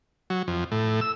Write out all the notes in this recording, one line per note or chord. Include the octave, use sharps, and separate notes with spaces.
F#3
F2
A2
E6